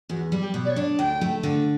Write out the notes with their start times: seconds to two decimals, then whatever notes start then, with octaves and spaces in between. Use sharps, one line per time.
0.09 E2 F#4
0.32 G3
0.39 G4
0.54 B2
0.64 D5
0.69 C#5
0.76 D4
0.98 D2 G5
1.21 A3
1.43 D3